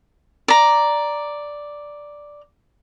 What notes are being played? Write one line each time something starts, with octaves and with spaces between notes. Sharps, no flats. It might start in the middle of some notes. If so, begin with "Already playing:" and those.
D5 A#5